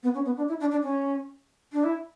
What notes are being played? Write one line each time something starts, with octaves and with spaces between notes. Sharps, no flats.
B3
C#4
B3
D4
E4
D4
D4
C#4
D4
E4